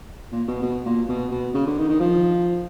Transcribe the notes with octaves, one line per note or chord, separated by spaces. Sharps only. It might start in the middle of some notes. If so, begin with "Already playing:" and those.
A#2
B2
B2
A#2
B2
B2
C#3
D3
D#3
D#3
F3